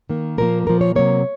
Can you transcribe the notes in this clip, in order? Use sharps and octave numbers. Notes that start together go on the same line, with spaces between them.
D#3 A#3
A#2 F3 A#3 A#4
A#2 F3 A#3 A#4
C#5
C3 F#3 A#3 C#5